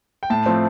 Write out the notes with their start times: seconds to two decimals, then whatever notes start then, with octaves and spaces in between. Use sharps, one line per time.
0.23 G5
0.30 A2 A5
0.46 F3 A3 C4